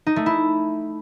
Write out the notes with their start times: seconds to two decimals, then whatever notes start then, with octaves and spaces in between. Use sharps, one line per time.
0.06 D#4
0.16 A3
0.26 E4